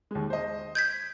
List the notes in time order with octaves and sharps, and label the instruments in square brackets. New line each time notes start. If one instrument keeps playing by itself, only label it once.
[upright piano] D#2 G#3
C5 D#5
[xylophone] G6 G#6 B6